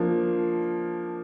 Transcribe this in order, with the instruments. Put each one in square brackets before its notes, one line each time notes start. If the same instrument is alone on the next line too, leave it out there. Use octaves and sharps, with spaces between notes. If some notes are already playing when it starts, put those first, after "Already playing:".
Already playing: [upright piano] F3 A#3 D4